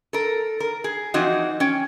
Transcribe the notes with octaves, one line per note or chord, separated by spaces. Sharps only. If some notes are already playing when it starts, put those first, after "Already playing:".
A4 A#4
A#4
G#4
E3 F3 C4 D#4 F#4
C#4 G5